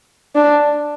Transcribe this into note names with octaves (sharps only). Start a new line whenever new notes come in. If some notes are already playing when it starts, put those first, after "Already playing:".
D4